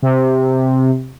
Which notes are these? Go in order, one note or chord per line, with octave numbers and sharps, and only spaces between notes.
C3